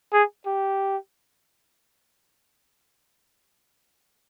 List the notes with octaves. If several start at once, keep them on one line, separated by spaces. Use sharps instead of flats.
G#4
G4